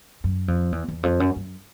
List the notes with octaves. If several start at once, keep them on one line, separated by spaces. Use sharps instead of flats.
F#2
F2
E2
E2
F2
F#2
F#2